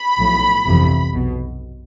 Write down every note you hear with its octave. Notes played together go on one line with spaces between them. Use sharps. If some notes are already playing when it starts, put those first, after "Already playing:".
Already playing: B5
B1 A2 F3
G1 F2 C3 E3
B1 B2